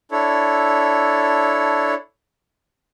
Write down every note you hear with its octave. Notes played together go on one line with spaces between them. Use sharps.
D4 E4 A4 C#5